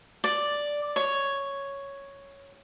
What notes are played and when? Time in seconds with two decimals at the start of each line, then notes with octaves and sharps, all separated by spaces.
0.24 D5
0.96 C#5